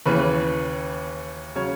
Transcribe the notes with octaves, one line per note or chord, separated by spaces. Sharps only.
D#2 C#3 E3 B4
C#3 F#3 C#5